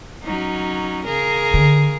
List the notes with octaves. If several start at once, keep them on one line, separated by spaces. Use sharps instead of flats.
F#3 C#4 D#4
C#3 G#4 A#4
D3